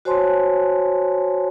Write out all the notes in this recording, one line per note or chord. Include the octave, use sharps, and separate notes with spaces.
F#4 C5 C#5 G#5 A5 C6